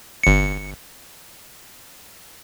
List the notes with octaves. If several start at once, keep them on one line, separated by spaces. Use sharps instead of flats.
G1 C#7